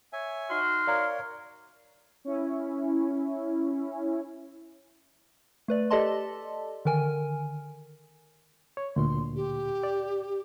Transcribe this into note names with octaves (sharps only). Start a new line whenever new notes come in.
C#5 E5 G#5
D#4 F#4 C6 F6
A#4 C#5 D5 F5 A#5
C#4 E4
A3 B4 D5
G4 A4 D5 D#5 A5 C6
D3 D#3 A#4 G#5
C#5
D2 A#2 C6
G4
D5